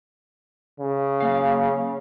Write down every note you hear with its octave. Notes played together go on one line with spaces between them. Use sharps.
C#3
F#3 A#3 F5